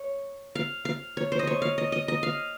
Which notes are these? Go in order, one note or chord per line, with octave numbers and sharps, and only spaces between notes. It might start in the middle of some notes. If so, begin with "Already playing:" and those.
Already playing: C#5
F5
F5
C#5
C5
D#5
C#5
F5
D#5
D#5
D#5
F5